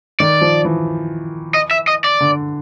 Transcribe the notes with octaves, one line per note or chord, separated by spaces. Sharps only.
D#3 D5
F3
E3
D#5
E5
D#5
D5
D3